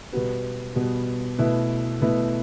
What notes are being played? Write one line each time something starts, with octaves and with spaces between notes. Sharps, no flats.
B2 G3 B3 F#4 B4
B2 G3 B3 F#4 B4
B2 A3 E4 B4
B2 A3 E4 B4